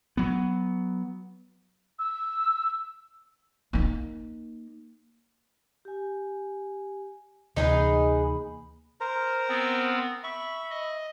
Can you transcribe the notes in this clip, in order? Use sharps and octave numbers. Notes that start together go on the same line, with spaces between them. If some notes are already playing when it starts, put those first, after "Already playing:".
F#3 B3
E6
A#3 D#4
G4 G#5
D2 C3 E3 A#3 D#4 G#4 B4 B5
A#4 C5 A#5
B3 C4
E5 B5 C#6
D#5